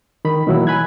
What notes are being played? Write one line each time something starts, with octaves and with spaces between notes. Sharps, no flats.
D#3 B5
B2 D#3 E3 F#3 A#3 E4
G#5 B5 F#6 G#6